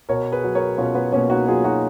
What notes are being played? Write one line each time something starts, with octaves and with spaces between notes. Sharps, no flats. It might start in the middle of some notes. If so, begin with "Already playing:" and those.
B2 A#4 C#5
G#4 B4
F#3
A#4 C#5
B2 C#4 F4
B3
B2 A#3 C#4
D#4 F#4
F#3 F4 G#4
D#4 F#4